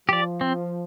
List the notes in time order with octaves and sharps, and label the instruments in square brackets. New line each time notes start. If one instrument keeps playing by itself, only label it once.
[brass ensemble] F3 [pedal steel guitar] G4 D5
[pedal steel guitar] C4